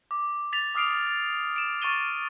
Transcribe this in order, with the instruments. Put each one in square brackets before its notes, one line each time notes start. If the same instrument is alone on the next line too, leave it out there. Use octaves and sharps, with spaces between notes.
[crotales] D6
A6 B6 F7
D6 D#6 F6 C7 D7 F7
A6
D7 E7
C#6 F6 A6 D#7 G7